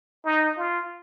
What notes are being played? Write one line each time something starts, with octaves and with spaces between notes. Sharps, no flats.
D#4
F4